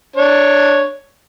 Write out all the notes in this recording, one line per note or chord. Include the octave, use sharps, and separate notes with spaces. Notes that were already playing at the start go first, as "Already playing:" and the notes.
D4 C#5